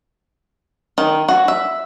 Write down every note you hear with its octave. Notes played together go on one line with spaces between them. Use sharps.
D#3
F#4
E5